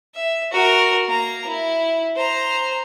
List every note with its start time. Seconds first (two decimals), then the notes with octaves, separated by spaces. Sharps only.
0.15 E5
0.52 F#4 A#4
1.06 A#3 A#5
1.47 E4
2.16 C5 A#5